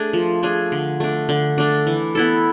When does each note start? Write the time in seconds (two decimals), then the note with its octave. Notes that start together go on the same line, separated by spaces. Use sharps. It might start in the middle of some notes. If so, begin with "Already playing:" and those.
Already playing: A3 D4 G#4
0.13 F3
0.43 A3 D4 G#4
0.72 D3
1.00 A3 D4
1.29 D3
1.58 A3 D4
1.87 E3
2.15 B3 E4 A4